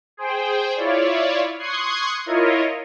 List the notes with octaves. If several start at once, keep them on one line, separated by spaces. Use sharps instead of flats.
G#4 C5 G5
E4 F4 C#5 D5
C6 C#6 D#6 F#6 G#6 C7
E4 F4 A#4 C#5 D#5